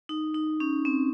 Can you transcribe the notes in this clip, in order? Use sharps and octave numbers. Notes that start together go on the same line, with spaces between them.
D#4
D#4
C#4
C4